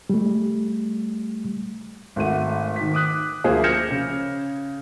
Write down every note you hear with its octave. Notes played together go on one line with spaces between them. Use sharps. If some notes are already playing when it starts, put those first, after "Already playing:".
G3 A3
G#1 A3 F#5 D#7
D#3 B6
D6 D#6 F#6 B6
D2 F3 A#3 F4 G#4 C5
F6 G6 G#6 A#6 C#7 E7
C#3